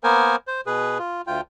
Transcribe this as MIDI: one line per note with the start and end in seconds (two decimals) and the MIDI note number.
0.04 0.36 58
0.04 0.36 59
0.04 0.36 70
0.04 0.36 72
0.04 0.36 80
0.47 0.61 72
0.67 0.98 47
0.67 0.98 68
0.67 0.98 71
0.98 1.22 65
1.27 1.41 38
1.27 1.41 65
1.27 1.41 79